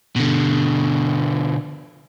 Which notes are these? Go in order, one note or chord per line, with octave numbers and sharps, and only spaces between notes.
B2 D3